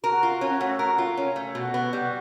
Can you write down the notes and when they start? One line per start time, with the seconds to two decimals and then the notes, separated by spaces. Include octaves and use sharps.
0.04 F#4 A#4
0.23 F4
0.41 C#4
0.61 A3
0.79 A#4
0.98 F4
1.17 C#4
1.36 A3
1.55 B2 F#4
1.74 B3
1.93 G3